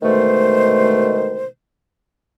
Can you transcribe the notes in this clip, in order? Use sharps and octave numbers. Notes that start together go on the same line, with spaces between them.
B2 D3 D#3 G#3 A3 C5